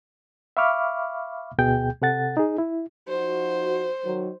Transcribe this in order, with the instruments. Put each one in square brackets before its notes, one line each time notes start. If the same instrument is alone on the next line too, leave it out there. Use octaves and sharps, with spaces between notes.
[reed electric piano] E5 F5 B5 C#6 D6 F6
D2 B2 G#4 G5 G6
C3 A4 F#5 A6
D#4 G#4
E4
[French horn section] F3 D#4 F#4 [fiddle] C5
[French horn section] D#3 F#3